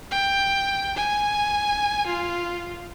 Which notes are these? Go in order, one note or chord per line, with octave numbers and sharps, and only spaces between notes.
G5
G#5
F4